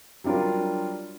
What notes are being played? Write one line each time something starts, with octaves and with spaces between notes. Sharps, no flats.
F#3 G3 D4 F4 A#4